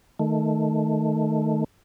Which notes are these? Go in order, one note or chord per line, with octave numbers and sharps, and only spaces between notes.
D#3 A3